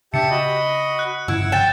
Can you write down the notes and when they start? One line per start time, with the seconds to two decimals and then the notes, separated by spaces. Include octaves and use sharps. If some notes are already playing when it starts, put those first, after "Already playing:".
0.14 C#3 D4 G4 E5 A5 C#7
0.30 F#4 D#5 B5
0.99 F#6
1.28 G1 C#3 F3 E4 F#5 E6
1.52 G5 G6 A6 E7